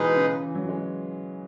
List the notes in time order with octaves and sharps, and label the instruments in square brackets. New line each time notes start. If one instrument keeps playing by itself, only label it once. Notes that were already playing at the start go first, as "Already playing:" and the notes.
Already playing: [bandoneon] B2 G#3 D#4 G#4 B4 [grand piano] E3
[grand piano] C#3
E3
F#3
G#3